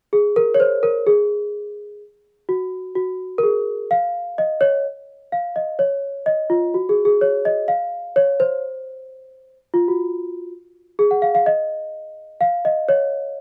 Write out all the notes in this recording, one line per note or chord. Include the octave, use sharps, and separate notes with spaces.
G#4
A#4
C#5
C5
A#4
G#4
F#4
F#4
A#4
G#4
F5
D#5
C#5
F5
D#5
C#5
D#5
F4
F#4
G#4
G#4
C#5
D#5
F5
C#5
C5
F4
F#4
G#4
F#5
F5
F5
D#5
F5
D#5
C#5